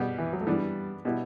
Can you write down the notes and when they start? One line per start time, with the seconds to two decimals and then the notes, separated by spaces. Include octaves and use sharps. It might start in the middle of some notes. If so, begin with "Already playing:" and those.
Already playing: B2 G3 B3
0.18 E3
0.33 F#3
0.40 A3
0.47 E3 G3 B3 D4
1.05 B2 G3 B3 E4